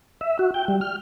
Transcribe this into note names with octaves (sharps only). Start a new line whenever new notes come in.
E5
F#4
G5
G3
F6